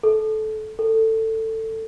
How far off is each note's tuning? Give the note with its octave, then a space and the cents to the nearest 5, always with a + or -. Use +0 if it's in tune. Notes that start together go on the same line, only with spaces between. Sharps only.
A4 -20
A4 +15